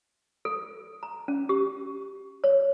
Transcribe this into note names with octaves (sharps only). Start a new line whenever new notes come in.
A4
A#5
C#4
G4
C#5